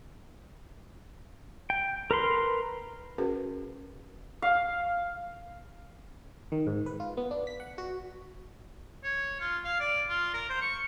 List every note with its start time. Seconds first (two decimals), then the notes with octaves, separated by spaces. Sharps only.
1.70 G5
2.11 A#4 B4 C6
3.18 C#4 F#4 G#4 A#4 B4
4.42 F5
6.52 D#3
6.67 G#2
6.86 B4
7.00 F4
7.17 B3
7.31 D4
7.47 B6
7.60 F#5
7.78 F#4
9.04 C#5
9.40 F4
9.65 F5
9.80 D5
10.09 F4
10.34 A#4
10.49 C5
10.61 C#6